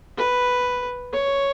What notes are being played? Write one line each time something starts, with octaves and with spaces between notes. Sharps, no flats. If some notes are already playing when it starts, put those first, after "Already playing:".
B4
C#5